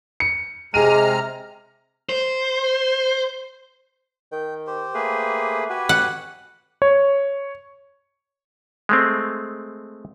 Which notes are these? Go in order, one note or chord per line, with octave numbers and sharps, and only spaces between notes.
C#7
C3 G#3 G#4 A#5 F6 D#7
C5
D#3 G5
G4 C5
A3 A#3 G#4 B4
F#4 G4 B4 G#5
F#5
C#5
G#3 A3 C4